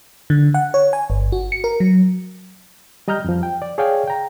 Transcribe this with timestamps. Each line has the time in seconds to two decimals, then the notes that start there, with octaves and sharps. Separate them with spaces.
0.30 D3
0.54 F#5
0.74 C#5
0.93 G#5
1.10 G1
1.32 F#4
1.52 C#7
1.64 A#4
1.80 F#3
3.08 G3 D#5 A#5 F6 G6
3.24 F2 F3
3.43 G5
3.62 D5
3.78 G#4 C#5 D5 F5 G5 G#5
4.08 G5 A#5